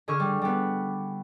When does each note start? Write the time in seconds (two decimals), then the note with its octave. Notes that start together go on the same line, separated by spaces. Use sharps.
0.08 D3 G#4 C#6 F6
0.20 G3
0.42 G3 B3